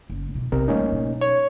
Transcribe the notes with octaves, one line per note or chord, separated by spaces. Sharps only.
F#1
B2 E4
B1 C3 A#4
G3 A3 A#3 C#4 D#4
B2 F#3
C#5